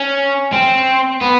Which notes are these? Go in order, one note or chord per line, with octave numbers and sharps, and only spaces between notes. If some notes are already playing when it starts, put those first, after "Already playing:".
Already playing: C#4
C4
B3